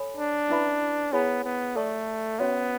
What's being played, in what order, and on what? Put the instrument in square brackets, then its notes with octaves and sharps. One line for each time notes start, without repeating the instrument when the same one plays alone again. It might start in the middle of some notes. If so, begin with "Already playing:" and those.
Already playing: [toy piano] A4 C#5 G#5 B5
[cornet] D4
[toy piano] C#4 E4 B4 E5 B5
[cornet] B3 [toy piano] E4 G#4 C#5 G#5 B5
[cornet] B3
[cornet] A3 [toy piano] A4 D5 A5 C#6
[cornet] B3 [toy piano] C#4 F#4 C#5 E5